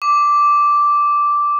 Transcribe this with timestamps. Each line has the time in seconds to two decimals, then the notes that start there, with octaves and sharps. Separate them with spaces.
0.02 D6